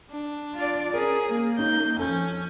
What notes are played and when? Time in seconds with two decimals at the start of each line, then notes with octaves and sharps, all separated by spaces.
0.11 D4
0.56 F4 D5
0.94 C#4 G#4 A#4
1.28 A#3
1.59 C#4 D#4 G6
1.99 F2 C#4 A4 G6